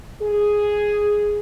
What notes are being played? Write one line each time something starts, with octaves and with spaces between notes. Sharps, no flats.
G#4